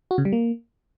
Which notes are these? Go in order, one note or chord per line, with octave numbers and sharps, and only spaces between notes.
F#4
C#3
G3
A#3